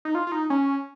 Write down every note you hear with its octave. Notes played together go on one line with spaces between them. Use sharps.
D#4
F4
F4
D#4
C#4